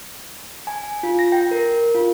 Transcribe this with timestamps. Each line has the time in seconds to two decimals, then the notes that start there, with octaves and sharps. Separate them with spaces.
0.67 G#5
1.03 F4
1.19 A#6
1.32 G5
1.51 A#4
1.95 F4